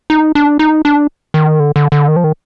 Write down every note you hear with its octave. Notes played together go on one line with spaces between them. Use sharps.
D#4
D4
D#4
D4
D#3
D3
D3
D3
D#3
F3
D#3